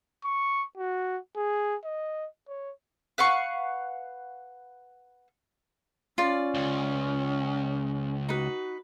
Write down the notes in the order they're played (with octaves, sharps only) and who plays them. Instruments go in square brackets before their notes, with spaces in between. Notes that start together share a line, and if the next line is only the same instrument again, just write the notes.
[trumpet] C#6
F#4
G#4
D#5
C#5
[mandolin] B4 F5 F#5 C#6
[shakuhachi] C#4 [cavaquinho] F4 D5
[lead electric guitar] C#2
[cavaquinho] D#4 B4 [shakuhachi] F#4